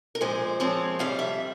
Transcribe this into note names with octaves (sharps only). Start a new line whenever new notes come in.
A#4
A#2 F3 G#3 C4 C5
A#2 F3 G#3 C4 C#5
F2 C3 G3 F5
E5